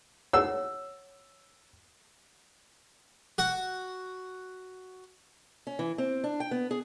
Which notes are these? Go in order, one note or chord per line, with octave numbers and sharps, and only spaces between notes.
C#5 F#5 E6
F#4 F#5
C#4
E3
C4
D4
G5
B3
G#4